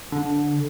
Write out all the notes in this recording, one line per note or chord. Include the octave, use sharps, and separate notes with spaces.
D3